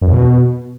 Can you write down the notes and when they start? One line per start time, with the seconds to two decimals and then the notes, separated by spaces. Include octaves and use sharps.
0.01 F#2
0.07 E2
0.12 B2